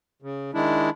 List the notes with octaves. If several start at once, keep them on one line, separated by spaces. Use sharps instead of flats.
C#3
D#3 G#3 D4 E4